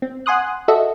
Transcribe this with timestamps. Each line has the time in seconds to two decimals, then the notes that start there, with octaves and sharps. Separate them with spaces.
0.02 C4
0.26 F#5 G#5 C6 D#6 F#6
0.68 F#4 A4 D#5 E5